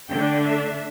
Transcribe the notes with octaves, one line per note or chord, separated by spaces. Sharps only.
D3 A3 D4 G5
E5